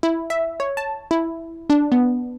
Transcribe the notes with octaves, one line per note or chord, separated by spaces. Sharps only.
E4
E5
C#5
A5
E4
D4
B3